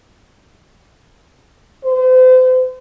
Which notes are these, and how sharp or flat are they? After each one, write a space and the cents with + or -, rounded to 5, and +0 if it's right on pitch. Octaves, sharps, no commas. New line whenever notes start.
C5 -35